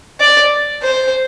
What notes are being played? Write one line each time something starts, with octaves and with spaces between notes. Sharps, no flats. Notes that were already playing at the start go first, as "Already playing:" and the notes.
D5
C5